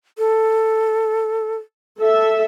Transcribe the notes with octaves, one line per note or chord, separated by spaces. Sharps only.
A4
A4 E5